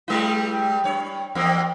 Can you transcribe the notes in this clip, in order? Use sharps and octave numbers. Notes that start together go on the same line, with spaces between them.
G3 G#3 E4
G2 C#5
E2 A#3 C4